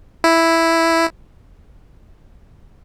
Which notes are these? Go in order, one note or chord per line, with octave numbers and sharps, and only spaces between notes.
E4